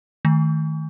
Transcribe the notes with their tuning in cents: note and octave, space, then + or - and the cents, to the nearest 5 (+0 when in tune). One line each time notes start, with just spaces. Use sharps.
D#3 +10 A3 -15